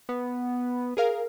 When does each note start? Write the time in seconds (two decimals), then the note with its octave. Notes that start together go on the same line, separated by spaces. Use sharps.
0.09 B3
0.97 G#4 A#4 F5